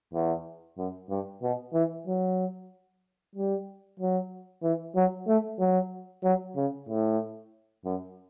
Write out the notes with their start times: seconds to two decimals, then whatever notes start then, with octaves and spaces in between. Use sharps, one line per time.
0.13 E2
0.78 F#2
1.09 G2
1.42 B2
1.73 E3
2.07 F#3
3.35 G3
3.99 F#3
4.63 E3
4.96 F#3
5.27 A3
5.59 F#3
6.24 F#3
6.56 C#3
6.89 A2
7.85 F#2